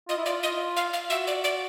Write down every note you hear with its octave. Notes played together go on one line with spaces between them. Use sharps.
F4 D#5
E4
F4 D5
D#5
F5
F5
F#4 E5
D5
D5